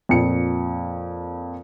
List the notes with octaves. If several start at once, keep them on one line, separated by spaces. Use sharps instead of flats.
F2 A#2 C#7